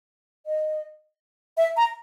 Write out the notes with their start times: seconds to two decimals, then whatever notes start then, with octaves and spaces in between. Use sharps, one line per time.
0.46 D#5
1.57 E5
1.77 A#5